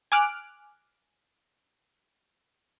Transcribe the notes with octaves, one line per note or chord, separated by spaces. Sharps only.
G#5 D6 F6 F#6 D7